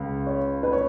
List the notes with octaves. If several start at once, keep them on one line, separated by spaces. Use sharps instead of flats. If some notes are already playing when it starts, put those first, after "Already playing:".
Already playing: C#2 C#3
C#5
B4
C#5